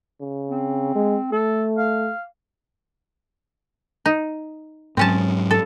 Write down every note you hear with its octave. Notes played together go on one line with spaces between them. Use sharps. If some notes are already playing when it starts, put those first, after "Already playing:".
C#3
C4
G#3
A3 A4
F5
D#4
G#2 F#3 C4 C#4 A5
A4